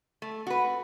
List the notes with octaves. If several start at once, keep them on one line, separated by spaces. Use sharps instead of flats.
A3
F#4 B4